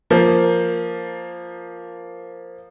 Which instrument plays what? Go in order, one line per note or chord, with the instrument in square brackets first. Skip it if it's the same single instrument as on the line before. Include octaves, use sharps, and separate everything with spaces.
[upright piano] F3 A#3